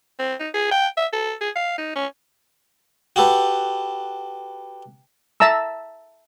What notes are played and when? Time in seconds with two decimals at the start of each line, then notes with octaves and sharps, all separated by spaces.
0.19 C4
0.40 D#4
0.54 G#4
0.71 G5
0.97 E5
1.13 A4
1.41 G#4
1.56 F5
1.78 D#4
1.95 C#4
3.16 F#4 G4 A4 B4
5.40 E5 A5 A#5 E6